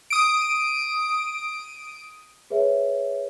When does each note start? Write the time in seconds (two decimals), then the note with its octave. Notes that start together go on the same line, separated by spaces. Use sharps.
0.10 D#6 D7
2.50 G#4 B4 C#5 E5